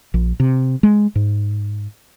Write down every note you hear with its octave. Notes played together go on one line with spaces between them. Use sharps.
A#1
C3
G#3
G#2